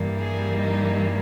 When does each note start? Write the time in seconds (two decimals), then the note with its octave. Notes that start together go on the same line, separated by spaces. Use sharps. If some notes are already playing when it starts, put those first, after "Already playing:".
Already playing: G2 E3 G3 A#3
0.19 G#4
0.56 D#4